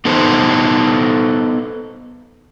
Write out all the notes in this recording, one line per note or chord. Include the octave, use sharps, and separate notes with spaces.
B3 D#4 A4 B4 C5